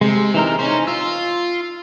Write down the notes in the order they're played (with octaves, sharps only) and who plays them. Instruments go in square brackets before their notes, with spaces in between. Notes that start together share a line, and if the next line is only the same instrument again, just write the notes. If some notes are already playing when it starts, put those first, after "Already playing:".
[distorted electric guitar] C3 [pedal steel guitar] G#3
[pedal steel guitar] E3 D#4 A#4
[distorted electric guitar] C#4 [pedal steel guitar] D#4 C5
[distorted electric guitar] F4 [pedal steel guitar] E6